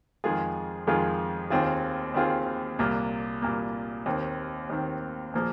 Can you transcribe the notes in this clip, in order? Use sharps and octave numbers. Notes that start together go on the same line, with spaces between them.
F2 D#3 G#3 F4 G#4
F2 D#3 G#3 F4 G#4
D#2 D#3 C4 F4 G#4
D#2 D#3 C4 F4 G#4
C2 A#2 A#3
C2 A#2 A#3
D#2 D#3 C4
D#2 D#3 C4
A#2 F3 A#3 G#4